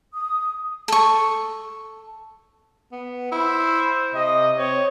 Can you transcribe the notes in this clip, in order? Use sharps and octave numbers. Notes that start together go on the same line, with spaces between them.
D#6
A4 C#6
B3
E4 C5
C3 D#5
C4 C#5